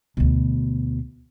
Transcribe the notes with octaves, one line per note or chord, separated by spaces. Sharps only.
D2 B2